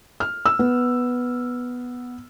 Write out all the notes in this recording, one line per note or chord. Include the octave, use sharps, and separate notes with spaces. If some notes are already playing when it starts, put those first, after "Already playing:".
F6
E6
B3